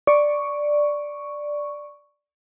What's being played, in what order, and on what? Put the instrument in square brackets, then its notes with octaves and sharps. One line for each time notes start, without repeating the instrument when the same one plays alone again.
[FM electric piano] D5 C#6